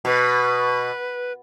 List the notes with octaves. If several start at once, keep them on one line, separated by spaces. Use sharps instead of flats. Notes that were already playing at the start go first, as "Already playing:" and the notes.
B2 B4